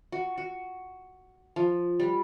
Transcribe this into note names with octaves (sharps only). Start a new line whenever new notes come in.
F#4
F#4
F3
G3